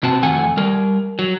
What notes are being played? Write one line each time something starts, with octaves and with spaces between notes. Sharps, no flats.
C3 C4 F#4 A5
F2 D#3 A3 F#5 G#5
G3 A#4
F#3